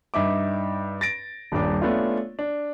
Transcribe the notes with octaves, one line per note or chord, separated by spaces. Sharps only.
G2 D#4 E5 D6
A6 A#6 D7
D#1 G2 D4 D6
A3 B3 C#4 D4 F4
D4